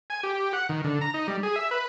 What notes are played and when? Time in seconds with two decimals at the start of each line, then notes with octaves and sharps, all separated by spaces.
0.10 G#5
0.23 G4
0.53 F#5
0.69 D#3
0.84 D3
1.01 A#5
1.14 D#4
1.28 G3
1.43 G#4
1.56 E5
1.71 B4